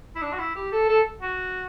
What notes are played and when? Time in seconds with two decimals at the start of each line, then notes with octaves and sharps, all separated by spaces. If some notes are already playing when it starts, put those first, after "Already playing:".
0.16 E4
0.22 D4
0.32 F#4
0.39 E4
0.56 G4
0.72 A4
0.88 A4
1.22 F#4